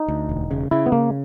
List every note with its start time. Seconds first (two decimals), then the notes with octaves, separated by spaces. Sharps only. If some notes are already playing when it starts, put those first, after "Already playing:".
Already playing: D#4
0.08 D2
0.29 E1
0.51 C#3
0.71 C#3 E4
0.86 B3
0.92 C#3 A#3